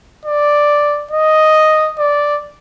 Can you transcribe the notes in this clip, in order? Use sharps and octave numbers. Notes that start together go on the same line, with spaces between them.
D5
D#5
D5